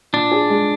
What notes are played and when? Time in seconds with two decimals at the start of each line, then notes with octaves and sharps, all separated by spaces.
0.13 A#2 D4
0.31 G#4
0.50 G#3